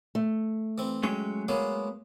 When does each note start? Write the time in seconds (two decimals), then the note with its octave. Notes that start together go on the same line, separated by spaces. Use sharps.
0.15 A3
0.78 E3 C4
1.03 F#3 G#3 C#4 G5
1.48 F#3 G#3 A#3 B3 C#5